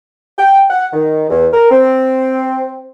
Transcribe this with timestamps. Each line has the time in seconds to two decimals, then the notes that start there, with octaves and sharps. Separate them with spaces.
0.38 G5
0.70 F#5
0.93 D#3
1.30 E2
1.53 A#4
1.71 C4